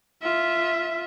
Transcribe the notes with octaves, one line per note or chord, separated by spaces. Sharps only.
F4 E5